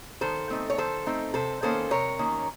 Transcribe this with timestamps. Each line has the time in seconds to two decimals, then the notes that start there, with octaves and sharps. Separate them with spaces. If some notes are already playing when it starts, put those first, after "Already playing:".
0.21 D#3 A4 C5
0.50 A3 C4 D#4
0.70 C#5
0.78 D#3 A4 C5
1.06 A3 C4 D#4
1.34 C3 A4 C5
1.62 D#3 A#3 C#4 A4 C5
1.91 C3 A#4 C#5
2.19 D#3 A#3 C#4